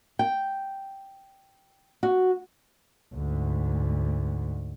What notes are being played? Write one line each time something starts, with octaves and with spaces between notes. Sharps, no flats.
G5
F#4
D2 G#2